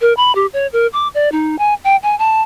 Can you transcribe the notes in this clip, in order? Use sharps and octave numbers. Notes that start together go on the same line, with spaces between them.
A#4
B5
G4
C#5
A#4
D6
D5
D#4
G#5
G5
G#5
A5